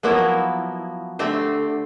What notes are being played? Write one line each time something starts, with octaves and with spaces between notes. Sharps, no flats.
F3 F#3 A#3 B3 E4
D3 A3 C4 G4 C5